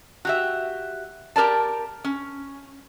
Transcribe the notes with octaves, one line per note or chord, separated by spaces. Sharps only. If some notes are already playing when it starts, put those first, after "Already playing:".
F#4 G4 E5
G4 A#4 D5 A5
C#4